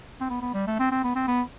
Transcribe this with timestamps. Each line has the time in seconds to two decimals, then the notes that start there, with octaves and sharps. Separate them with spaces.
0.20 C4
0.30 B3
0.42 B3
0.54 G3
0.67 A3
0.79 C4
0.91 C4
1.04 B3
1.15 C4
1.27 B3